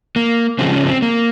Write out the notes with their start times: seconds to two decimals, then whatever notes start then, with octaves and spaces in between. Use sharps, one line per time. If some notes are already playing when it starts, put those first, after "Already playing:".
0.16 A#3
0.59 C#3 F3 G#3 C4
0.73 C#4
0.87 C4
1.02 A#3